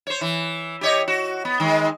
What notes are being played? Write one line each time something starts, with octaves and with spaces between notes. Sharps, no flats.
C5 C#5
E3
G4 C#5 D#5
F#4
B3
D#3 G#3